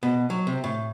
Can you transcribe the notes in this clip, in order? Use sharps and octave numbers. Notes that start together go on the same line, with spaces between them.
B2
F#3
C3
A2